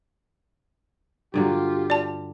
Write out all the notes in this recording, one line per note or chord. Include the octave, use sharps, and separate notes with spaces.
G2 D3 F#3 F4 G4
D5 A5